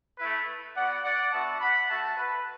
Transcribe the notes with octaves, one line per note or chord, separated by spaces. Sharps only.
A3 E4 B4
B3 F#4 D5 F#5
D5 F#5
B3 D4 F#4 E5 A5
F#5 B5
A3 F#4 E5 A5
B4